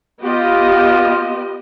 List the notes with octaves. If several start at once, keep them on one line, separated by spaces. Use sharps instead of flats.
B3 F4 G4 D#5